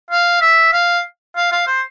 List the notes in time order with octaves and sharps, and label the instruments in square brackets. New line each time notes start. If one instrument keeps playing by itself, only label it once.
[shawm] F5
E5
F5
F5
F5
C5